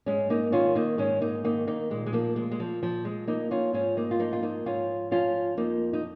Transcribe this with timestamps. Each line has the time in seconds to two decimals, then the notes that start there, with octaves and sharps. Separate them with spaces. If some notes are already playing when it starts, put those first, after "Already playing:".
0.06 G#2 G#3 C#4
0.30 A#3 D#4
0.52 D#3 C#4 F4
0.75 A#3 D#4
0.98 G#2 G#3 C#4
1.21 A#3 D#4
1.44 D#3 A#3 D#4
1.67 A#3 D#4
1.90 A#2 G#3
2.06 G#3
2.13 F3 A#3
2.36 F3 G#3
2.51 G#3
2.60 F3
2.82 A#2 F3
3.05 G#3
3.27 F3 A#3 D#4
3.51 C#4 F4
3.73 G#2 C#4 F4
3.97 A#3 D#4
4.11 F4
4.19 F3 A#3 D#4
4.33 F4
4.43 A#3 D#4
4.65 G#2 C#4 F4
5.11 F3 C#4 F4
5.57 F2 A#3 D#4
5.93 D#4